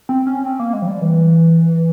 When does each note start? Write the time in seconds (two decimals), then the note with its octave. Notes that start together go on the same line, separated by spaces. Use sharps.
0.09 C4
0.27 C#4
0.45 C4
0.60 A#3
0.73 G#3
0.82 F3
0.87 G3
1.02 E3